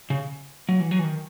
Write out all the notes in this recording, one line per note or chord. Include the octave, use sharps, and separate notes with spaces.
C#3
F#3
E3
F#3
E3
D#3